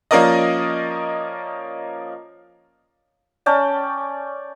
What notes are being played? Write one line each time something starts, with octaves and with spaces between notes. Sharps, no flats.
F3 A#3 C#4 A#4 D5 D#5
C#4 D5 G5 A5